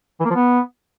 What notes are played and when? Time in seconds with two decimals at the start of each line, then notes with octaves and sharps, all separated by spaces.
0.20 E3
0.25 A#3
0.30 F3
0.35 B3